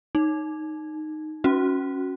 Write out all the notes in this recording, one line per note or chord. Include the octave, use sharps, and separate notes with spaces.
D#4
C#4 F#4